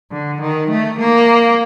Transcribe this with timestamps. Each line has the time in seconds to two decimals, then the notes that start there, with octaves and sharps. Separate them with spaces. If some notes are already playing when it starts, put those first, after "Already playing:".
0.11 D3
0.41 D#3
0.70 A3
0.99 A#3